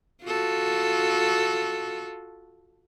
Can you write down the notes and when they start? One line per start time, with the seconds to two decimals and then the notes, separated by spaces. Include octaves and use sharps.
0.24 F4 F#4 A4